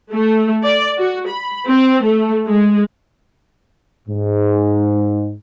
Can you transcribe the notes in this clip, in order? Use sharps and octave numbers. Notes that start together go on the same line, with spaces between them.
A3
D5
F#4
B5
C4
A3
G#3
G#2